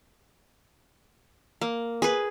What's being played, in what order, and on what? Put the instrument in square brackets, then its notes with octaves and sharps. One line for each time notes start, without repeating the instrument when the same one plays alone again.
[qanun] A#3
G#4 B4